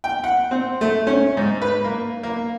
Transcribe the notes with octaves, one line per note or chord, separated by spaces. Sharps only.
G5
F#5
C4
A3
C#4
G#2
B4
A#3
A#3